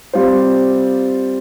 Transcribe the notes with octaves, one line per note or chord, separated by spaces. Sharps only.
G3 C4 F4 C5